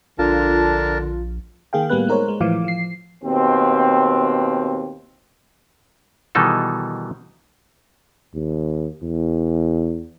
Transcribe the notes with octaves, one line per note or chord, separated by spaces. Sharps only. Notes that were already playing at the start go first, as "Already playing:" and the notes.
A#1 D3 D4 F4 A#4 A5
D#3 A#3 G#4 F5 G5
A2 G3 A#3 B3 B4 F#6
G#3 D#4 A#4 C5 C#5
G#3
A2 E3 F3 F5 D6
F3 C7
D#2 B2 C4
B2 D#3 E3 G3 D#4 A4
D#2
E2